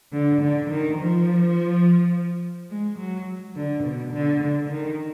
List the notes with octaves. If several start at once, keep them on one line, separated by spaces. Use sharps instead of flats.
D3
D3
D#3
F3
G#3
F#3
D3
B2
D3
D3
D#3